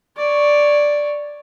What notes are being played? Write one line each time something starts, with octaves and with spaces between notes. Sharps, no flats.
C#5 D5